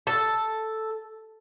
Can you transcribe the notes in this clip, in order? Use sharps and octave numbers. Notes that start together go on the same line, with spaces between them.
A4